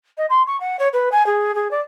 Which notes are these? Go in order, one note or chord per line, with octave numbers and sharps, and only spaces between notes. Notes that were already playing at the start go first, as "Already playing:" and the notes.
D#5
C6
C#6
F#5
C#5
B4
G#5
G#4
G#4
D5